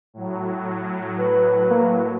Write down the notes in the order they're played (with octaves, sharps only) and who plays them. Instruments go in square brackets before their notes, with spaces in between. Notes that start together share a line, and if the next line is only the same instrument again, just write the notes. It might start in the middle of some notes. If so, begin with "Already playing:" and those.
[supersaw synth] A2 F#3
[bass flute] B4
[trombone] A#3